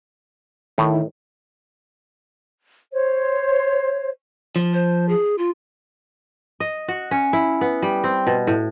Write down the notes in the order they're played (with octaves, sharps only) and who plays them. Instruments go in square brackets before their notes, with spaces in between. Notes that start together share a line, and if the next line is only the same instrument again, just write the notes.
[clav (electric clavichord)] A2 [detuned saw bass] D#3 [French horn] E4
[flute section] C5 C#5
[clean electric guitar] F3
[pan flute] C5
G#4
F4
[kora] D#5
F#4
C#4
E4
B3
G3
C4
B2
A2